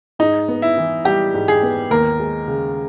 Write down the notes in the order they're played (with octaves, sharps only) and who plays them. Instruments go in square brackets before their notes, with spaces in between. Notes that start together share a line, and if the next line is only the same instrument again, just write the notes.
[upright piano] G#2 [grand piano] D#4
[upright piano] B3
[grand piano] E4
[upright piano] E3
[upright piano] G3 [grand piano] G4
[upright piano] G#2
[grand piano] G#4
[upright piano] B3
[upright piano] D#2 [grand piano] A#4
[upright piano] G#3
C#3